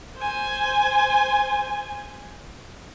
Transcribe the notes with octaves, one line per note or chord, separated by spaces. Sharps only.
C5 G#5